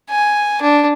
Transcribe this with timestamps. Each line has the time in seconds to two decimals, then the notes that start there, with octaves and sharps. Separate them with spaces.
0.10 G#5
0.62 D4